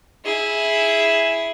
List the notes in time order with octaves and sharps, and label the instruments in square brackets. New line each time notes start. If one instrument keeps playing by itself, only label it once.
[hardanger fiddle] E4 G#4